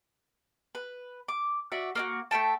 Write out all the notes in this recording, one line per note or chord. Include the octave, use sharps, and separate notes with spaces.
B4
D6
F#4 D5 E5
A#3 D4 F#4
A3 E5 G5 A5